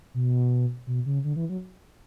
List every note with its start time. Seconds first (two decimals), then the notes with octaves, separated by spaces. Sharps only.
0.14 B2
0.87 B2
1.06 C#3
1.24 D3
1.36 E3
1.49 F#3